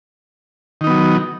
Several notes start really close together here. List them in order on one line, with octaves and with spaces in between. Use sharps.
D#3 D#4 B3 F#3